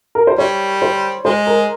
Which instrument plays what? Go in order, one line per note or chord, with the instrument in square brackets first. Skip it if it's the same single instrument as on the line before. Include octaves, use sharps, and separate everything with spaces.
[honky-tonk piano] A#4
C5
[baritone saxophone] G3 [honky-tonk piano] C#5
[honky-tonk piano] C5
[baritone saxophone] G#3 [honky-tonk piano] C5
[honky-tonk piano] A#4